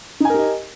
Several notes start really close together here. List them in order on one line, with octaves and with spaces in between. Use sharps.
D#4 G#5 A#4 G4 D#5